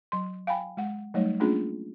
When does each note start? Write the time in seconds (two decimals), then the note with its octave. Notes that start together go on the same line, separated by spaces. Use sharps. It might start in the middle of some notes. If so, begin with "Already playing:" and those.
0.12 F#3 C6
0.47 F5 G5 G#5 B5
0.77 G#3 F#5
1.14 F#3 G3 A3 D#4 C#5
1.40 A3 A#3 C#4 D4 F4 G#4